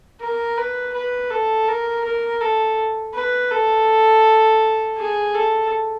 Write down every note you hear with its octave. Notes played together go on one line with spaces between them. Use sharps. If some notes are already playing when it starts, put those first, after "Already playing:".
A#4
B4
B4
A4
A#4
A#4
A4
B4
A4
G#4
A4